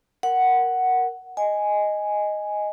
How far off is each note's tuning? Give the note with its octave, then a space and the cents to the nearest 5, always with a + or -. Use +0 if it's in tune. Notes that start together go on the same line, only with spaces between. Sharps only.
A#4 +5 F#5 +5
D#5 +0 G#5 +0